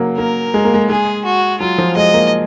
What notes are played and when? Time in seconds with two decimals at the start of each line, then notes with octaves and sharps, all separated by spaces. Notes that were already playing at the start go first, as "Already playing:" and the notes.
Already playing: C#3 F#3 A#3
0.18 A#3 A#4
0.54 G#3
0.65 A#3
0.74 G#3
0.89 G#3 G#4
1.25 F#4
1.60 F#3 F4
1.78 F3
1.97 G#3 D#5
2.14 A#3